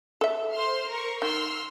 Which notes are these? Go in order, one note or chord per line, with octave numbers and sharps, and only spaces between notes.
A4 E5
C5 C6 F6
A#4 C#6
D#3 C6 E6 F6